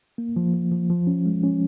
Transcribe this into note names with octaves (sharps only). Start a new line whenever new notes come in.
A#3
F3
F3
F3
F3
C#4
G#3
C#4